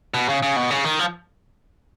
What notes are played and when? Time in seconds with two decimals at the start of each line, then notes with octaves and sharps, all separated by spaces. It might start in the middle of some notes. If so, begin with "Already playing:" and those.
0.14 B2
0.29 C#3
0.43 C#3
0.56 B2
0.70 C#3
0.85 D#3
0.99 F3